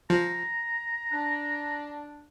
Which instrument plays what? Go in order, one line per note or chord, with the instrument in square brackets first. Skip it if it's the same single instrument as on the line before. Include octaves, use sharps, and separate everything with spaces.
[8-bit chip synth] F3 [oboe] A#5
[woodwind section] D4